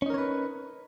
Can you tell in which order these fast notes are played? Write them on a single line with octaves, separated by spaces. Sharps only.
C#4 D#4 A#4 C#5 B4